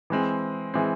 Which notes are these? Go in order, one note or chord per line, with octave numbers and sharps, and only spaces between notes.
E3 G#3 C4
E3 G#3 C4